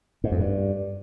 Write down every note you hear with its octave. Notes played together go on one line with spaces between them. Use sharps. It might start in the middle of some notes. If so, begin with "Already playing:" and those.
G#2
F2
G2